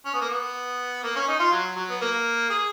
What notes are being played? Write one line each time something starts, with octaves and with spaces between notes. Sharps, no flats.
C#4
B3
A#3
B3
A#3
C#4
D#4
F4
F#3
F#3
B3
A#3
G#4